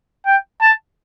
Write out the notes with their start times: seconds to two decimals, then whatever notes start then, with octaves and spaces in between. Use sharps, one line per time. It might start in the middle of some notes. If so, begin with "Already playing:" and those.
0.26 G5
0.61 A5